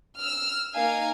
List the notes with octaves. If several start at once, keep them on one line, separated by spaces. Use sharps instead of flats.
E6 F6
A#3 D#4 A#4 F5 G#5